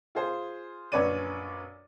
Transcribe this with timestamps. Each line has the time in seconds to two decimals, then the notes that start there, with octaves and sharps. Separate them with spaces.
0.15 F4 G#4 C5
0.92 A#1 F#2 B4 C#5 D5 D#7